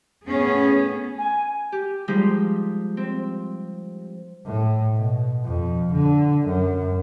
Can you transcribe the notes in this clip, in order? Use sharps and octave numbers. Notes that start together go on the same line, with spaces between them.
A2 B3 C#4 G#4
G#5
G4
F3 G3 G#3 D#4 G4
C4
A2
B2
F2
D3
F#2